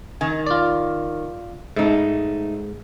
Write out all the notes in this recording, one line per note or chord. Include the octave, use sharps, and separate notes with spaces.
D#3 G#5
F4 D5
G#2 A3 D#4